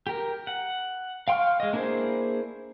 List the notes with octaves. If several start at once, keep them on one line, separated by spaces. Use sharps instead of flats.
G4 A#4
F#5
F5 G5 C6 C#6 F6
G#3 D#5
A#3 D4 E4 G#4 C5